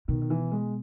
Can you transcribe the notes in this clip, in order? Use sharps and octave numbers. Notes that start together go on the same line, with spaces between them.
B2 D#3
D#3
E3
G#3